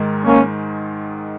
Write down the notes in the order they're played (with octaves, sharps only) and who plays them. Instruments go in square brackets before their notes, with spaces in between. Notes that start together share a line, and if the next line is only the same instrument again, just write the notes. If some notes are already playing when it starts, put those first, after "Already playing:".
Already playing: [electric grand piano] G#2 D#3 G#3 D#4
[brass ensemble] A#3 C#4